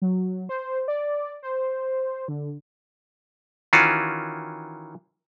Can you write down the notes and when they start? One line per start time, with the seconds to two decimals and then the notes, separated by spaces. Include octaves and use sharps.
0.02 F#3
0.49 C5
0.88 D5
1.43 C5
2.28 D3
3.73 D#3 E3 C#4 F4 F#4